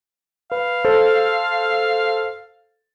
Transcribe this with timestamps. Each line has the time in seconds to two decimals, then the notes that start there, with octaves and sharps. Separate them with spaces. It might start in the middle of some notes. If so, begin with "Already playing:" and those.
0.52 B4 F5
0.85 A4 C5